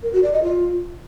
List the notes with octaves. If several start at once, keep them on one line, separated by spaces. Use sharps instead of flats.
A#4
F#4
D5
D#5
F4